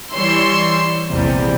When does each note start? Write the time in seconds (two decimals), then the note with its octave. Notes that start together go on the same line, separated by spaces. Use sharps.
0.12 E3 G3 C#5 C6 E6
1.10 A#1 E2 C3 G3